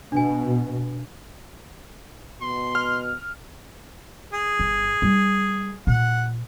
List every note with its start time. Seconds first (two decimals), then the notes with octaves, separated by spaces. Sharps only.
0.12 B2 D4 G#5
2.41 B2 C6
2.75 F6
4.33 G#4
4.59 G1
5.02 G3 D#4
5.87 A#2 F#5